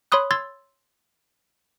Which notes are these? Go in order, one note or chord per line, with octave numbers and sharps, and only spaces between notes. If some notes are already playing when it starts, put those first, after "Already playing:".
C#5 B5 C6 D#6 F#6
C6 E6 G#6 A6